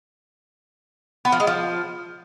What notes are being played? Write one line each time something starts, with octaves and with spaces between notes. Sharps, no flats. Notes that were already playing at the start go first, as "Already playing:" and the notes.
B3
F3
G#3
F3